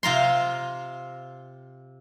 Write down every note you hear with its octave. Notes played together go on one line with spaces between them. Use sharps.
C3 F4 A#5 C6